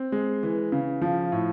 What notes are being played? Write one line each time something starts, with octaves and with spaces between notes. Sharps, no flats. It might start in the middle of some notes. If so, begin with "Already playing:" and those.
Already playing: C4
G#3
E3
C#3
F3
A2